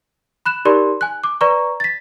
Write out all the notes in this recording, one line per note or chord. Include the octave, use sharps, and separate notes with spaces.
B5 F#6 E7
D#4 G4 A#4 D5 B5 C6
G#5 F#6
D6
B4 D5 A#5 C#6
A6 B6